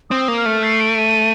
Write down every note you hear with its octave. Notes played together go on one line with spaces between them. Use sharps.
C4 D#6
A#3
F6
A3
C7
D7
D#7